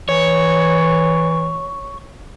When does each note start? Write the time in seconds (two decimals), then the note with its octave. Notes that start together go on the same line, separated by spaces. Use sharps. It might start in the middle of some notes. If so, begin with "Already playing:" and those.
0.09 E3 C#5